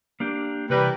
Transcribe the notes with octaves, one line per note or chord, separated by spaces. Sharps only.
A#3 D4 G4
C3 E3 G3 A#4 B4